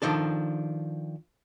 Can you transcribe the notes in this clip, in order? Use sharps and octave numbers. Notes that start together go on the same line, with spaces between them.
D#3 F3 D4 A4